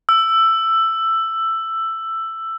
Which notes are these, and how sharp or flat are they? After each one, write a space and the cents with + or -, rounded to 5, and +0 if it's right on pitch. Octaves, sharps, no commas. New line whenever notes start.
E6 +10